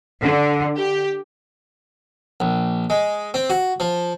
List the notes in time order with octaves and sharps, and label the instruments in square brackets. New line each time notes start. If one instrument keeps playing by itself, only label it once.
[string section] D3
G4
[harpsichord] A#1
G#3
C4
F#4
F3